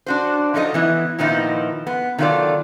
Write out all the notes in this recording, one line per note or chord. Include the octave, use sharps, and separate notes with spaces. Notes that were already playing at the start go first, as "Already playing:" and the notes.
D4 F#4 C5
F3 F#3 D#4 A4 D#5
E3 B3 E4
A#2 D#3 F3 B3 D#4 E4
B3
D#3 F#3 D#4 F4 A4 D5